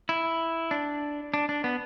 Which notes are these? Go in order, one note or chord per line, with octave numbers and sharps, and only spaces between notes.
E4
D4
D4
D4
B3